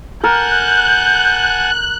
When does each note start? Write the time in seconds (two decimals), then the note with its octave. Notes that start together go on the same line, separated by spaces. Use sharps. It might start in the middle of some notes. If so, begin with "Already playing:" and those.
0.24 A#4 F#5 G#5 A5 F#6 G6